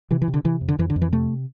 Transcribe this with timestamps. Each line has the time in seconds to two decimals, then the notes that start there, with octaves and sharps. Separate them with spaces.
0.11 C3 E3
0.22 E3
0.28 C3
0.34 D3
0.44 C3 E3
0.61 F2
0.68 D3
0.79 F2 E3
0.90 D3
0.96 F2
1.02 E3
1.12 C3 A3